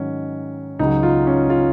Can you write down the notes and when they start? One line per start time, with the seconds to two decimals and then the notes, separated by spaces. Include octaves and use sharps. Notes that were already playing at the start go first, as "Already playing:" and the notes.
Already playing: G#2 D#3 F#3 C#4
0.79 C#2 C#3 F#3 D#4
1.03 F4
1.27 C#4
1.50 F4